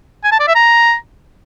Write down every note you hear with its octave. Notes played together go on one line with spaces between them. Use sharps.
G#5
A5
D5
E5
A#5